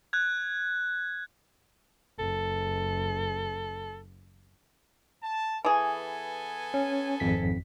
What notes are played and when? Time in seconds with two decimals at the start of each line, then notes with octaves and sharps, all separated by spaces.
0.13 F#6 G#6
2.19 F#1 A4
5.22 A5
5.65 E3 B3 G#4 A4 G#5
6.74 C#4
7.20 G#1 F2 B6